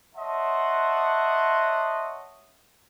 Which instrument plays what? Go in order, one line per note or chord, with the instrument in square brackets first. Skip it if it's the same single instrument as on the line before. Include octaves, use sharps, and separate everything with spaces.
[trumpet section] C#5 D#5 E5 F#5 A5 C6